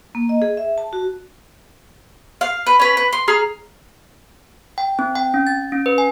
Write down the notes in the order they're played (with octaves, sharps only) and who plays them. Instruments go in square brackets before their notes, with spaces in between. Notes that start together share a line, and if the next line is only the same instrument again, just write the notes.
[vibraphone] A#3
D#5
G#4
E5
A5
F#4
[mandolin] F5
B4
C#4 B4
B4
C6
G#4 A#5 F6
[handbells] G5
C4
G5
C#4
A6
C#4
B4
G#5